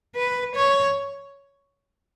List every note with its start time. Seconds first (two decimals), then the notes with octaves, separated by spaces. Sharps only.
0.15 B4
0.55 C#5